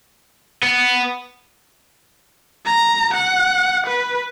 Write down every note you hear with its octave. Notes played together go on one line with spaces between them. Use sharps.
B3
A#5
F#5
B4